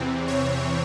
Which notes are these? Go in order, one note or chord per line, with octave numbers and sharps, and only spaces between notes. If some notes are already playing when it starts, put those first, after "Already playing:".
Already playing: E2 C3 E3 C4
C#5